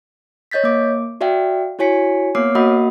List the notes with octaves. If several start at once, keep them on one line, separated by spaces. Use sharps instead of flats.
C#5 D#5 G6 A6 B6
A#3 D6
F#4 D5 E5 F5 G5
E4 F#4 C#5 G#5 B6 C#7
A#3 B3 C#5 D6 F6 C7
A#3 F#4 D#5 F#5 B5 D#6